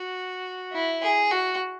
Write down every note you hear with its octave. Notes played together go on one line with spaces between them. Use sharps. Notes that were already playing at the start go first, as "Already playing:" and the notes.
Already playing: F#4
E4
G#4
F#4